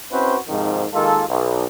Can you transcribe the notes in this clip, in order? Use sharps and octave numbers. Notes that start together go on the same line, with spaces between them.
C4 C#4 E4 F#4 B4 C5
G#2 C3 D#3 F3
D#3 G#3 A#3 F4 A4
B1